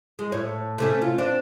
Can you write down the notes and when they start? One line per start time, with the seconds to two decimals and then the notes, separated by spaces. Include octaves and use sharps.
0.19 G#3
0.32 A2 C#5
0.78 C3 A3 C#4
1.02 F4
1.18 C4 D4